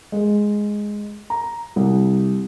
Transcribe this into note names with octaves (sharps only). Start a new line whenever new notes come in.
G#3
A#5
C2